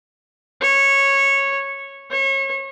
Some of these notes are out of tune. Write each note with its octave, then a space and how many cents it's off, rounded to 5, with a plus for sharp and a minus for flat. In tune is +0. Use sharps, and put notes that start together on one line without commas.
C#5 -10
C#5 -30